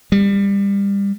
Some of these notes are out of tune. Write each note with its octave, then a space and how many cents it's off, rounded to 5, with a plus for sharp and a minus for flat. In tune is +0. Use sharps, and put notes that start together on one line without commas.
G3 +25